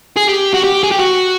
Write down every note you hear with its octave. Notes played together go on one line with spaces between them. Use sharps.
G#4
G4
F#4
G4
G#4
G4
F#4